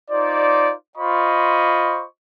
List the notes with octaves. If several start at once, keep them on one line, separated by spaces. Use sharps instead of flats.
D#4 F4 C5 D5
F4 C5 D#5 B5 C#6